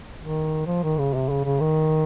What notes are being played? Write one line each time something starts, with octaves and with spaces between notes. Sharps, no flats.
D#3
F3
D#3
C#3
C3
C#3
C#3
D#3